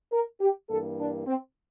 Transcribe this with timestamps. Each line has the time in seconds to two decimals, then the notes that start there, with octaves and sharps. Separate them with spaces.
0.12 A#4
0.40 G4
0.69 G2 E3 A#3 A4
0.98 D4
1.26 C4